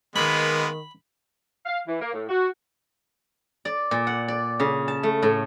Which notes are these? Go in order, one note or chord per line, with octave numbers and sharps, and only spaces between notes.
D#3 G#3 A#3 B3 B5
F5
E3
A#3
A2
F#4
D5
A#2
F#5
D5
C#3
A5
A3
A2